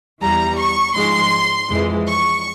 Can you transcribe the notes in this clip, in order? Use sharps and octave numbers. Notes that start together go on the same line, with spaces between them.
E2 E3 G3 A#5
C#6
G#2 F3 G#3 C6
F2 E3 G#3
C#6